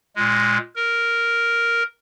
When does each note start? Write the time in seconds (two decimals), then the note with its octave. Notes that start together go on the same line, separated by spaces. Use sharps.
0.16 A#2 G#3
0.76 A#4